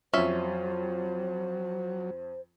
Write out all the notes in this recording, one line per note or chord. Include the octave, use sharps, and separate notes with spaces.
F2 F#3 C#4 F4 C5 E5